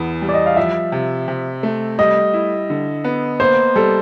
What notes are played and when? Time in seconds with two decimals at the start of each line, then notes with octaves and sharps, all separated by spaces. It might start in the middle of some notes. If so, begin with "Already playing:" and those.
Already playing: E2 B3
0.22 G3
0.29 D5
0.34 D#5
0.46 F5
0.57 F3 E5
0.92 C3
1.28 C3
1.63 A3
1.99 G3 D#5
2.34 E4
2.70 D3
3.04 B3
3.40 A#3 C5
3.76 G3 A4